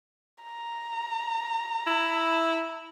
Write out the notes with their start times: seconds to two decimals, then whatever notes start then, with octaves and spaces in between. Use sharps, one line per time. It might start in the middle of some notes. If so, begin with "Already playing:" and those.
0.43 A#5
1.87 E4